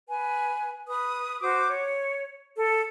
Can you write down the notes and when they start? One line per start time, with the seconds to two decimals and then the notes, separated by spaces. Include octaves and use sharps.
0.09 B4 G#5
0.88 B4 D#6
1.42 F#4 C5 D6
1.69 C#5
2.57 A4